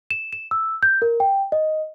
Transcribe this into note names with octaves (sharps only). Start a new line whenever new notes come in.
E7
E7
E6
G6
A#4
G5
D#5